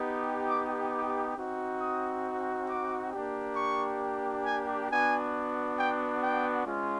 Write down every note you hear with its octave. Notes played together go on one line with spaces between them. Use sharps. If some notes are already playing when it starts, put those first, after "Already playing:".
Already playing: B3 D#4 G4
D6
D6
C4 D#4 F#4
D#6
D6
A#3 D4 G4
C#6
G#5
B3 D4 F#4 G#5
G5
G5
G#3 C#4 F4